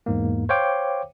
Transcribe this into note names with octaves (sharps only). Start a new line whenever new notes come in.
E2 G#2 A#3
C5 C#5 F5 G5 D6